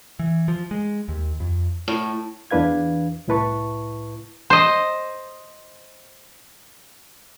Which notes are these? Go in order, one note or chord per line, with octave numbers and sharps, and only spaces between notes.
E3
F3
G#3
D#2
F2
A2
E2 E3 D4 B4 F5 G#6
C2 A2 E4 B4 A5 C#6
C5 D#5